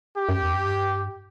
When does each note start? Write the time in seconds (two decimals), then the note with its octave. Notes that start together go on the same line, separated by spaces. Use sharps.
0.17 G4
0.29 F#2
0.42 E2
0.54 F#2
0.65 G2